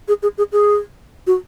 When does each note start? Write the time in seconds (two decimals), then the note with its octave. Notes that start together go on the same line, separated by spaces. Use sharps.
0.08 G#4
0.23 G#4
0.38 G#4
0.52 G#4
1.27 F#4